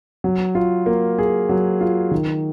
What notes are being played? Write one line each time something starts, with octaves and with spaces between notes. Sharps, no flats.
F#3
F4
A#3
G#4
F#3
F4
D#3